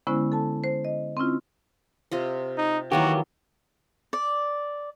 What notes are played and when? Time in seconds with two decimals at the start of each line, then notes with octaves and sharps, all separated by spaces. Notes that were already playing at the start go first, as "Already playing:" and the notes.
0.07 D3 G#3 B3 C#4 E4 C5
0.32 A4 A5
0.64 C5
0.85 D#5
1.17 C4 C#4 E4 F4
2.11 C3 F4 D#5
2.57 D#4
2.92 D#3 E3 F#3 A#3 F#4 G4
4.13 D5